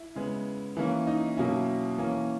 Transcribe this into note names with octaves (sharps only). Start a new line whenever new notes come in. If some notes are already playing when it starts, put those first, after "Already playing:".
Already playing: E4
C#3 G#3 B3
E3 A#3 C#4 E4
D#4
B2 F#3 A#3 C#4 E4
E3 A#3 C#4